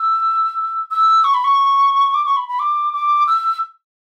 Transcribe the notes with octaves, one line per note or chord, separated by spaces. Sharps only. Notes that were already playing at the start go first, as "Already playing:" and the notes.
Already playing: E6
E6
C#6
B5
C#6
D6
C#6
B5
B5
D6
D6
E6